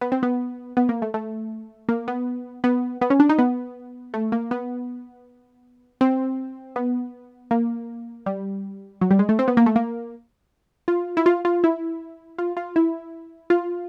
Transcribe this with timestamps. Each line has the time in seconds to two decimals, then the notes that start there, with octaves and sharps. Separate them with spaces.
0.01 B3
0.12 C4
0.23 B3
0.77 B3
0.89 A#3
1.02 A3
1.14 A3
1.89 A#3
2.08 B3
2.64 B3
3.01 B3
3.10 C#4
3.20 D4
3.29 D#4
3.38 B3
4.14 A3
4.32 A#3
4.51 B3
6.01 C4
6.76 B3
7.51 A#3
8.26 G3
9.01 F#3
9.11 G3
9.19 G#3
9.29 A3
9.39 C4
9.48 B3
9.57 A#3
9.66 A3
9.76 A#3
10.88 F4
11.17 E4
11.26 F4
11.45 F4
11.64 E4
12.38 F4
12.57 F4
12.76 E4
13.50 F4